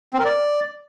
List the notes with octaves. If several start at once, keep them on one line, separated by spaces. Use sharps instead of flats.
C4
A#4
D5